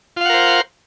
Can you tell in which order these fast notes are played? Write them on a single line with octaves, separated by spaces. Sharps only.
F4 F5 F#5 A#4 C5